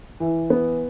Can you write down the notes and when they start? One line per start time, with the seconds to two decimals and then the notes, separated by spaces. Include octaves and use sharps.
0.20 E3
0.50 B3